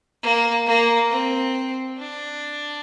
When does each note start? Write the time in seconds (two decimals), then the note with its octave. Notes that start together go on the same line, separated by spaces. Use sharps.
0.23 A#3
0.66 A#3
1.10 C4
1.98 D4